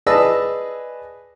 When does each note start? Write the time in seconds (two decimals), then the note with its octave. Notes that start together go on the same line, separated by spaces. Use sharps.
0.07 G#4 B4 D5 D#5 A5 E6